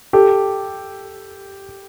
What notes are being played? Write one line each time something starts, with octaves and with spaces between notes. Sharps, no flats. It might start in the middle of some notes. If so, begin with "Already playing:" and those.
G4 A4